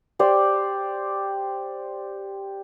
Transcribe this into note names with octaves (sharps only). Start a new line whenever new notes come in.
G4 C5 D5